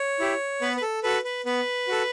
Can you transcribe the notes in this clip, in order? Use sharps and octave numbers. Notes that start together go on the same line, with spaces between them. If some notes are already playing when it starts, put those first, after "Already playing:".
Already playing: C#5
E4 G4
B3 B4
B4
A4
F#4 A4 B4
B4
B3 B4
F#4 A4